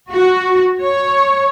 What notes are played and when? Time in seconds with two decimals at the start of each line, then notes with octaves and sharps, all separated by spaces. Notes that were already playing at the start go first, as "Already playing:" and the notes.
0.10 F#4
0.81 C#5